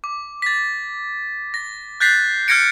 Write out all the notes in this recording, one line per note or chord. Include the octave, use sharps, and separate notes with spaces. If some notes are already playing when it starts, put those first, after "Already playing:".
D6
A6 B6
A#6
F#6 G6 A6 B6 C7
F6 G6 G#6 A#6 C#7 D7